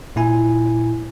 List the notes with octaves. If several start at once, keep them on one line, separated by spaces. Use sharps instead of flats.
A#2 E4 G#5